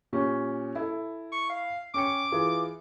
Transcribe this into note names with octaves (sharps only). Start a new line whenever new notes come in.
A#2 C#4 G4
E4 A4
C#6
F5
C#4 G5 D6 C#7
E3 F4 G#4